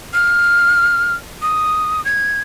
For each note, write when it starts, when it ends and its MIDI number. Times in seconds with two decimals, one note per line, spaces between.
0.13 1.14 89
1.42 2.04 87
2.05 2.41 92